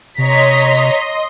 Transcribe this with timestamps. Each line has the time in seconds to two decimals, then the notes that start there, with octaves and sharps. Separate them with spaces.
0.18 C3 C#5 D#5 A#5 C6 B6